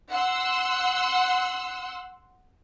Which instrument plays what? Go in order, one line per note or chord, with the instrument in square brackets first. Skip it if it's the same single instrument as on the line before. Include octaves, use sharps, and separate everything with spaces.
[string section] F#5 C6 E6